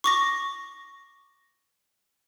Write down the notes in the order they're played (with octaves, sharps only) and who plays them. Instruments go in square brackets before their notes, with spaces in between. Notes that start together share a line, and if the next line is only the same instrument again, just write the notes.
[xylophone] C#6 D6 A#6